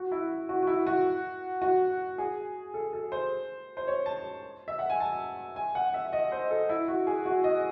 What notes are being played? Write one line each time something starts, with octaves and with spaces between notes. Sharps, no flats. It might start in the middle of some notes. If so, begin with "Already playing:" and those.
Already playing: F#4
E4
F#4
F#4
E4
F#4
F#4
G#4
A4
A4
C5
C5
C#5
A5
E5
F#5
G#5
A5
G#5
F#5
E5
D#5
C5
A4
E4
F#4
G#4
F#4
D#5